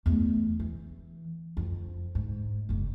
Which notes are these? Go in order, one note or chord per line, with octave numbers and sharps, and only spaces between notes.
E2 A3
E3
F2
G#2
F#1 A#3